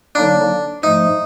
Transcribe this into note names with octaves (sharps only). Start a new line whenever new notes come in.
D3 F#3 A#3 D4 D#4
G#2 F3 A3 D#4